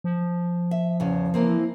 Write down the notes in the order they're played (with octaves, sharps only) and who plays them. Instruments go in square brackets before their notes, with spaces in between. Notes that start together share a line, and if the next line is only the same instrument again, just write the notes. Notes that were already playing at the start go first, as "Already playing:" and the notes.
[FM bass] F3
[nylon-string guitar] E5
E2 C#3
E3 A#3 C4